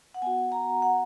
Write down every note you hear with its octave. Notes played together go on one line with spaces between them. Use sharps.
F#5
B3 F#4 G#5
A#5
F#5